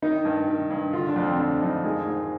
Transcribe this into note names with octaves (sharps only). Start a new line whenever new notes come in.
D#3 D#4
G2
D#3
G2
D3 F4
D4
F2
C4
D3 D4
F2 D#4
D#3 G#3
G#2